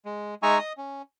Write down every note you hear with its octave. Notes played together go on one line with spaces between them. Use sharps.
G#3
G#3 D#4 E5 G#5 A#5 C#6
D#5 D#6
C#4